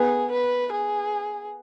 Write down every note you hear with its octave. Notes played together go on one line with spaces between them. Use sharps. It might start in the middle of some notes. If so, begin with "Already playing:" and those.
Already playing: B3 G#4
B4
G#4